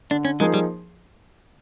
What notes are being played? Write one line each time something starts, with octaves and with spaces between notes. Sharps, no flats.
D3 D4
C#4
F3 G#3 A#3 D#4 G#4
G3